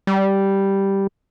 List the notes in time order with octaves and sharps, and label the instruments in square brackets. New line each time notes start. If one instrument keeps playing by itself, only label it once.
[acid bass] G3